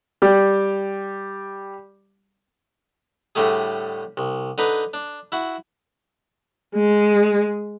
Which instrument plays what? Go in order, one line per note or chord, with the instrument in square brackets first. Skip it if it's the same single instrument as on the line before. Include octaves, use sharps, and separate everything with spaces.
[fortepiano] G3 G4
[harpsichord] A2 D3 G3 A3 G#4
C2
D3 D#4 B4
D4
E4 F#4
[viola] G#3